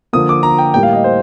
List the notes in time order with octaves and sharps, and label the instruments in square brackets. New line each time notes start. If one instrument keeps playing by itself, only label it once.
[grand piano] D3 F3 A#3 D#6
D6
A#5
G5
A2 G3 A#3 G5
F5
D#5
C5